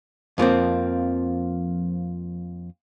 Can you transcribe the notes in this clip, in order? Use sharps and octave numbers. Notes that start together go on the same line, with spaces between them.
F2 F3 A#3 C4